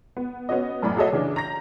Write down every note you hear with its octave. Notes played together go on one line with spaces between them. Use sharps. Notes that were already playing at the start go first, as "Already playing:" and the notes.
B3
B3 C#4 F#4 D#5
F#2 A2 D5 B5
F#4 G#4 A4 C#5 D#5 E5
C#3 E3 C#4 D4
A#5 G6 A#6